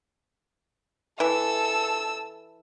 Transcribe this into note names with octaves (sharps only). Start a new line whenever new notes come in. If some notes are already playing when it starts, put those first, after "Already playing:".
E3 A4 E6